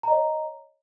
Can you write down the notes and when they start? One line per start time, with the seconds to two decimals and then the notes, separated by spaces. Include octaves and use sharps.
0.03 A#5
0.08 D#5
0.12 C#5